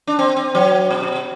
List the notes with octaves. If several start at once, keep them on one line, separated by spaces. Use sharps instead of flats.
D4
C4
C4
F#3
B2